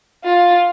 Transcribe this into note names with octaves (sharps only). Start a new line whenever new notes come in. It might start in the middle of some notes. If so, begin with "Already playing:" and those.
F4